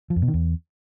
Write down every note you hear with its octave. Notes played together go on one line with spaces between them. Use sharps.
F3
F2
B2
D#3
E2